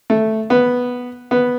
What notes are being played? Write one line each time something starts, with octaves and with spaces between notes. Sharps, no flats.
A3
B3
B3